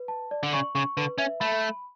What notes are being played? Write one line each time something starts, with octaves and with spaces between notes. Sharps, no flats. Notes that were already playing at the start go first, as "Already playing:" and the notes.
Already playing: B4
A5
D5
D3
C#3 C#6
C#3 C#6
D3 B4
C#4 E5
A3 B5